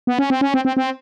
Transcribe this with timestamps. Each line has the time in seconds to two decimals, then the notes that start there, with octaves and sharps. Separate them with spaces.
0.07 B3
0.19 C#4
0.30 C4
0.41 C#4
0.54 C4
0.65 C4
0.77 C4